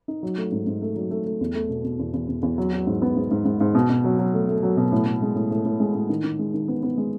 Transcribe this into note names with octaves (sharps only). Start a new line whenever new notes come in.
D#4
F#3
A3
G#2
G#2
A3
F#3
A3
A3
E2
A3
B2
B2
E2
E2
E2
E2
F#3
F#3
G#2
B3
G#2
G#2
G#2
G#2
B2
B2
F#3
F#3
A3
A3
F#3
B2
A2
A2
G#3
A2
A2
A2
G#3
A2
D#3
D#3
G#3
D#3
B3
B3
G#3